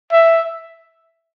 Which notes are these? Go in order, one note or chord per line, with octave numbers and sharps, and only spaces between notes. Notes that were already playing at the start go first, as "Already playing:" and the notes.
E5